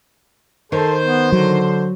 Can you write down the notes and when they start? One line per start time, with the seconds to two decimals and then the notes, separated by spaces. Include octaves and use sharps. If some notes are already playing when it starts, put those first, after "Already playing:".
0.72 D#3 A4 C5
1.01 B3
1.32 D3 F#3